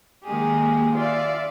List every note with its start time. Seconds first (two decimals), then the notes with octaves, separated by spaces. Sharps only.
0.24 D#3 G#3 A#3 G4 G#4
0.95 F4 D5 E5 F5